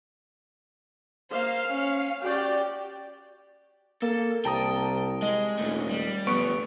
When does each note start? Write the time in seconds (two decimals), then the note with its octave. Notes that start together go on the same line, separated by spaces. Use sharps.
1.31 A#3 C5 F5
1.67 C#4
2.23 F#4 G4 D5 G5
4.02 A#3 A4
4.45 C2 G5 A5 A#5 D#6
5.22 G#3 D#5
5.58 D#1 C#2 A3
5.89 G3
6.27 G1 F3 A3 B3 C#6 D7